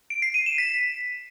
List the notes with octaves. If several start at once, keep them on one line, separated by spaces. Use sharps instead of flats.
D7
C7
D#7
E7
B6